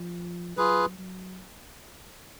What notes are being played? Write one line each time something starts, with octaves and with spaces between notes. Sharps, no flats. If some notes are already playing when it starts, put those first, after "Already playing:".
Already playing: F3
F#3 F4 G#4 B4
F#3